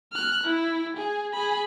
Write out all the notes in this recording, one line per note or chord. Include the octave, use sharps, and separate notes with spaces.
F6 F#6
E4
G#4
G#4 B5